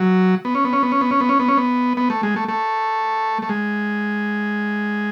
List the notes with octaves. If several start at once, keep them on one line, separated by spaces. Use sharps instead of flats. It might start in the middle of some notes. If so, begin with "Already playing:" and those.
Already playing: F#3
B3
C#4
B3
C#4
B3
C#4
B3
C#4
B3
C#4
B3
C#4
B3
B3
A3
G#3
A3
A3
A3
G#3